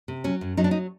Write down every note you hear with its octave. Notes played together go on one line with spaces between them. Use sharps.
C3
F#3 C#4
F#2
F#3 D#4
D4
D#4